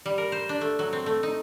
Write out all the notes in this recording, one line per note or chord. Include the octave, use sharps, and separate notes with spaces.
G3
A#4
C5
D4
A3
F#3
C4
A3
D#4